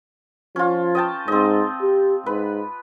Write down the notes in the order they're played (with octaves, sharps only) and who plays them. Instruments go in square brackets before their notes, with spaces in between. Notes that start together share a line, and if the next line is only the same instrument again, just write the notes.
[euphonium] F3 [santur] C#4 F4
[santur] D#5 G5 A5
[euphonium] G#2 [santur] C4 D#5
[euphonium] G4
[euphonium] G#2 [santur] B4